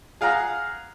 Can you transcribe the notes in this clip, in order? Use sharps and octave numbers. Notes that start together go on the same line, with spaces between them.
G#4 F5 F#5 A#5